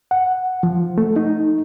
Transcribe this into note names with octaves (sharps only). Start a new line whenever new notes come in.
F#5
F3
A3
D#4